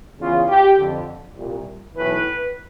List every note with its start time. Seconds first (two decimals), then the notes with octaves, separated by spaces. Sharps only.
0.20 E2 C#3 E3 F4
0.49 G4
0.78 F2 D3
1.37 C2 A#2
1.95 B1 A2 E3 B4